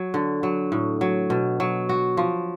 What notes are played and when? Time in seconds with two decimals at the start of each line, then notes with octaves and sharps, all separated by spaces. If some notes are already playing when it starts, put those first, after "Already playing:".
Already playing: F#3
0.14 D3
0.43 F#3
0.72 A2
1.01 F#3
1.30 B2
1.60 F#3
1.89 F#4
2.17 F3